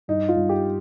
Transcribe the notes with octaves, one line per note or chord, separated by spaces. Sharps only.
G2 D#4
F4
G2
G4